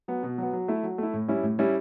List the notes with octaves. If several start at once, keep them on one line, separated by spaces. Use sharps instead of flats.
F#3 B3
B2
F#3 B3
F#3
A3 E4
F#3
A3 E4
A2
G3 C#4 E4
A2
G3 C#4 E4